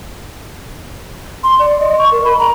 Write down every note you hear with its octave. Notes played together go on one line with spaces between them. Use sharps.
C6
D5
D#5
C#6
A#4
B5
A#5